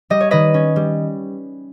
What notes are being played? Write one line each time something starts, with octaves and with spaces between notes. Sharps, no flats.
G3 D#5
C#5
D#3 B4 D#5
C#4
G3